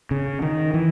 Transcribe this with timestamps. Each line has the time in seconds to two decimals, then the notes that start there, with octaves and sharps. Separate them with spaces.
0.11 C#3
0.42 D#3
0.74 E3